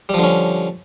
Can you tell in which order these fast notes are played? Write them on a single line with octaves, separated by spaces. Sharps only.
G3 F3 D3 C#4